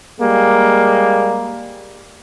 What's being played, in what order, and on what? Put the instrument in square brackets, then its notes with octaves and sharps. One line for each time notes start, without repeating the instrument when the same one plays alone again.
[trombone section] G3 G#3 A#3